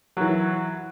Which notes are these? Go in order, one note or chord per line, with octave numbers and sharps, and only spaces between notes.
E3 F#3